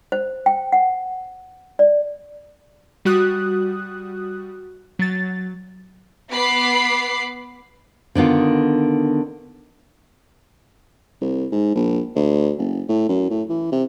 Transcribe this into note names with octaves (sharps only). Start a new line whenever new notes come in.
C5
G5
F#5
D5
G3 F#4 D#6 F#6
F#3 A6
B3 B5 D6 C7
D3 D#3 B3 F4
C2
G#2
A#1
D2
F#1
A2
F#2
A2
E3
C3